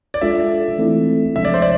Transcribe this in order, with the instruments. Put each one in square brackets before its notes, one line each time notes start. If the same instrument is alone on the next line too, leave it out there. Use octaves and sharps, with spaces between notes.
[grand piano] D5
[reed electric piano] G#3 D4 F4 A4 [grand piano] E5
[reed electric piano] E3 A3 C4 E4 A4
[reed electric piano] C3 F3 G#3 D4 [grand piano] E5
[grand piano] D5
C5
D5